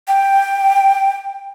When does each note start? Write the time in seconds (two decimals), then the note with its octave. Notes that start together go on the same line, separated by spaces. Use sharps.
0.08 G5